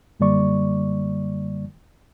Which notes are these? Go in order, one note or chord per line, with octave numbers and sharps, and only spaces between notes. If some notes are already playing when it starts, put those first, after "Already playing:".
F#2 D3 G3 A#3 D5 C#6